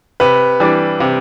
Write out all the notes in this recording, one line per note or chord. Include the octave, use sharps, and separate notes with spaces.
C3 B4
E3 G3 D4
C3